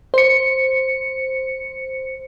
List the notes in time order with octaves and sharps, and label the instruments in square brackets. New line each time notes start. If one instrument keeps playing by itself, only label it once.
[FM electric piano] C5 C#7